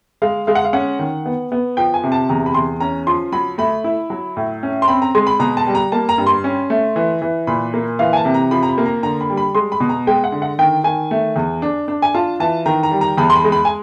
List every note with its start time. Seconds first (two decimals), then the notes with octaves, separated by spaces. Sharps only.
0.22 G#3 F5
0.47 G#3 F5
0.55 F#5
0.65 F5
0.73 C#4 F#5
0.99 D#3
1.26 B3
1.52 B3
1.77 F3 G5
1.94 G#5
2.03 C3
2.12 A5
2.29 E2 A#5
2.46 B5
2.54 E2 C6
2.80 C#4 A#5
3.07 F3 C6
3.32 F#3 B5
3.58 A3 B5
3.84 E4
4.10 F#3
4.37 A2
4.63 C#4
4.82 C6
4.88 C4 B5
5.02 A#5
5.15 G#3 C6
5.27 B5
5.39 B2 A#5
5.57 A5
5.67 G3
5.75 A#5
5.92 A#3 A5
6.09 A#5
6.18 G2
6.27 C6
6.44 C#4
6.70 A3
6.96 E3
7.22 E3
7.47 A#2 B5
7.74 A#3
7.99 E3 F5
8.13 G#5
8.17 A5
8.25 C3
8.34 A#5
8.51 F3 B5
8.63 A#5
8.68 B5
8.78 A#3
8.86 A#5
9.03 D3 A#5
9.21 B5
9.30 G3
9.37 B5
9.55 G#3 C6
9.72 B5
9.80 B2
9.89 A#5
10.07 G#3 G5
10.24 F#5
10.32 D3
10.42 F#5
10.59 D#3 G5
10.84 D#3 G#5
11.11 A3
11.36 E2
11.62 D4
11.88 D4
12.02 G#5
12.14 F4 A5
12.40 E3 A5
12.66 D#3 A#5
12.83 A#5
12.91 G3
13.01 A#5
13.18 E2 B5
13.30 C6
13.35 B5
13.44 G#3
13.52 B5
13.65 G#5